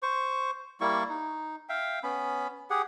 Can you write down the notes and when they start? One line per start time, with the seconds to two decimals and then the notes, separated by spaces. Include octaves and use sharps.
0.03 C5 C#6
0.81 G3 A#3 E4 C#6
1.09 D#4
1.69 E5 F5 G5
2.03 B3 C#4 B5
2.70 G4 G#4 F#5